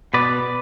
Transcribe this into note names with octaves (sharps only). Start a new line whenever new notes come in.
B2 B3 B4 D5